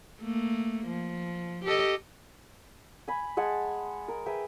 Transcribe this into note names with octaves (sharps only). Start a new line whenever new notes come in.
A3 A#3
F3
G4 A4 D#5
G#5 B5
G#3 F#5 G#5 A5
A#4
G#4 B4 E5 G5